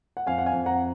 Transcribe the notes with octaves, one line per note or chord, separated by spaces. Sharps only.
F#5
F2 F5 G#5
F#5
F5 G#5
F2
F#5 A#5